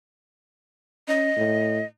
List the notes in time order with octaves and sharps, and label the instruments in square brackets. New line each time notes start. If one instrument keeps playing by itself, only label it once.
[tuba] C#4 [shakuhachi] D#5
[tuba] A2